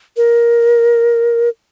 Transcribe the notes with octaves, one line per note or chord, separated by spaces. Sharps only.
A#4